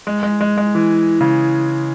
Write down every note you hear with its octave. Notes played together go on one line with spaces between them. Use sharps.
G#3
G#3
G#3
G#3
E3
C#3